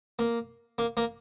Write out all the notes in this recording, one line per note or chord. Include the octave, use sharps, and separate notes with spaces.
A#3
A#3
A#3